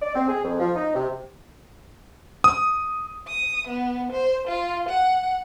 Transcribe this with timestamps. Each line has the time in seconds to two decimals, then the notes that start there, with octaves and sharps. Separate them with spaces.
0.02 D5
0.15 C4
0.28 G#4
0.44 F2
0.60 F3
0.76 D#4
0.94 C3
2.44 D#6
3.28 D#6
3.68 B3
4.12 C5
4.48 F4
4.89 F#5